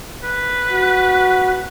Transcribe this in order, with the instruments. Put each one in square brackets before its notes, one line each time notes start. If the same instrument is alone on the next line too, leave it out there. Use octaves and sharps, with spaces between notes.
[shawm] B4
[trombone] F#4